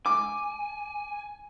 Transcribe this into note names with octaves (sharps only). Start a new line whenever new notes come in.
G#5 D6